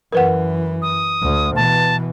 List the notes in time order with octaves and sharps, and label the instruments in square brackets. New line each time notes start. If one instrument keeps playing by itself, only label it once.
[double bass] F#2 E3 [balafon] A#4 B4 F#5
[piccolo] D#6
[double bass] D2
[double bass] B2 E3 [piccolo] A5